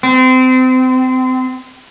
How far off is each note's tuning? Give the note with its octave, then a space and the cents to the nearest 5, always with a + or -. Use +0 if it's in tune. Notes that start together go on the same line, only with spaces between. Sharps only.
C4 -30